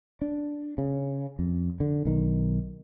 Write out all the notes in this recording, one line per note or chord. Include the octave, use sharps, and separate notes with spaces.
D4
C#3
F2
D3
B1 D#3